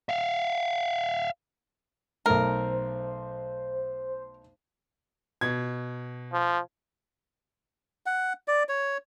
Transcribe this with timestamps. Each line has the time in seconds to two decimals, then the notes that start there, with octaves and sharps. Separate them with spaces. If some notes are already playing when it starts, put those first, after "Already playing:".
0.09 E5 F5
2.26 B1 A3 A#4 C5
5.41 B2 G#6
6.33 F3
8.06 F#5
8.48 D5
8.69 C#5